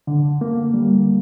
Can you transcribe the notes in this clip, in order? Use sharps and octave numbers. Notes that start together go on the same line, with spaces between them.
D3
A#3
G3